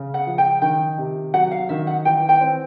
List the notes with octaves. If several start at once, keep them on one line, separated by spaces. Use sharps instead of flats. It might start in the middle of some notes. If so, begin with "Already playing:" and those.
Already playing: C#3
F#5
F3
G5
D#3 G5
C3
F#3 F#5
F5
D#3 E5
F#5
E3 G5
G5
C4